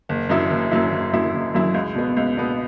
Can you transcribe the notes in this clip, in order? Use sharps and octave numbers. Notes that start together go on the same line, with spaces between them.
F#1
F#2 F#3 E4
F#1
F#2 F#3 E4
F#1
F#2 F#3 E4
F#1
F#2 F#3 E4
C#2
B2 B3
C#2
B2 B3